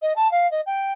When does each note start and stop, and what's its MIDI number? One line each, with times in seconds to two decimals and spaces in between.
0.02 0.13 75
0.16 0.30 81
0.31 0.49 77
0.51 0.61 75
0.66 0.93 79